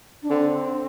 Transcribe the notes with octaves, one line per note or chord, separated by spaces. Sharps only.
D4
D3 C4